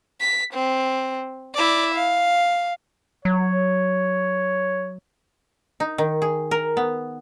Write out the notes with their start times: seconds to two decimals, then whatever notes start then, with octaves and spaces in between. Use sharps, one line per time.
0.21 B6
0.54 C4
1.54 E4 D5
1.95 F5
3.25 F#3 C#5
5.80 D#4
5.98 D#3
6.22 G#4
6.51 A#4
6.77 B3